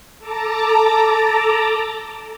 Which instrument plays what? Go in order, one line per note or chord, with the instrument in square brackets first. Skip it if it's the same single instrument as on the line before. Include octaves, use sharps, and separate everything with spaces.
[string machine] A4 A5 A#5 D6